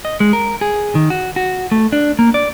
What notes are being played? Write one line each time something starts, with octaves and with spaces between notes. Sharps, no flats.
D#5
G#3
A#4
G#4
D#3
F#4
F#4
A3
D4
A#3
D5